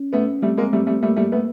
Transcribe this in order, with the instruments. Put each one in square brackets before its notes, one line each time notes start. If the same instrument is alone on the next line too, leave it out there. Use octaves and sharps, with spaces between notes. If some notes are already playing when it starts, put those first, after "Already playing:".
Already playing: [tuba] C#4
[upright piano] A3 B3
[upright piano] G3 A3 [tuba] C4
[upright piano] G#3 A#3
G3 A3
G3 A3
[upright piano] G3 A3 [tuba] A#3
[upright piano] G3 A3
A3 B3